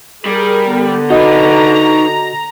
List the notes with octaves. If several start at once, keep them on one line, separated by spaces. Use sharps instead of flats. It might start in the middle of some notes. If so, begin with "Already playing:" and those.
G3 G#4 A#4
D3 B3
D#4 F#4 B4 D#5 A#5